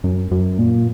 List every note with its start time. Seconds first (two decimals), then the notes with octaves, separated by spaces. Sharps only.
0.04 F#2
0.31 F#2
0.59 A#2